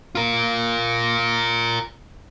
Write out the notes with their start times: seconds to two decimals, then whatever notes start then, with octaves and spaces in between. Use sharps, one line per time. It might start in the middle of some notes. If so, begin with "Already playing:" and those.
0.15 F4 A#4